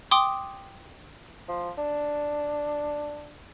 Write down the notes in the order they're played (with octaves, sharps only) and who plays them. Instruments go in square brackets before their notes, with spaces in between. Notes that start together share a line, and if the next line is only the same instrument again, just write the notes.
[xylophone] G5 C6 D6 D#6
[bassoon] F3
D4